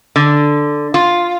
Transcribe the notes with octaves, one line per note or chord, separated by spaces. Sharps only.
D3
F4